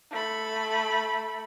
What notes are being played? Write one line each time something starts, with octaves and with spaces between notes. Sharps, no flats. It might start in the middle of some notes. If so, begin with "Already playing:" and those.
A3 B5